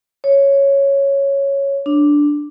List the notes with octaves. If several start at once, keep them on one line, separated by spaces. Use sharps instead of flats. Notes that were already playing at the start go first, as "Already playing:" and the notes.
C#5
D4